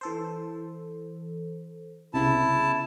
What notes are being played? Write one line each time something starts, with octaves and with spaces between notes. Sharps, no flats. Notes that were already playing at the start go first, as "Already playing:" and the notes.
E3 A4 C5
C2 C#3 B3 E4 A5